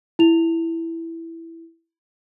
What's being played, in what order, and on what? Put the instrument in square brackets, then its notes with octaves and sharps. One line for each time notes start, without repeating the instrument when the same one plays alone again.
[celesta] E4 F7